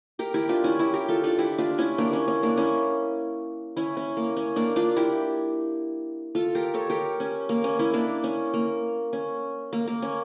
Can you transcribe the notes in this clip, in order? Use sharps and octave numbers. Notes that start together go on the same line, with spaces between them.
G4 A#4
E4 G4
D4 F4
C#4 E4
E4 G4
G4 A#4
F4 A4
D4 F4
E4 G4
D4 F4
C#4 E4
A#3 D4
C#4
C#4
A#3 D4
C#4 E4
C#4 E4
C#4
A#3
C#4
A#3 D4
D4 F4
E4 G4
F4 A4
G4 A#4
A4 C#5
G4 A#4
C#4
A#3
C#4
C#4 E4
A#3 D4
C#4
A#3
C#4
A#3
A#3
C#4